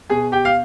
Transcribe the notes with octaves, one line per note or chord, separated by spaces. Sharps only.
B2 G#4 G#5
G4 G5
F5